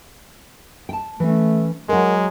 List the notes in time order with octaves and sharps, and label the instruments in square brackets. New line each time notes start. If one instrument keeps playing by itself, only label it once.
[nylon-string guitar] G5 A5
[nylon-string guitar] E3 C#4 [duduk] A3
[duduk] F#3 [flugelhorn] G#3 [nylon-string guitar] A#4 F#5